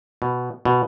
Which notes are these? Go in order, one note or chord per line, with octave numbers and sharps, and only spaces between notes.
B2
B2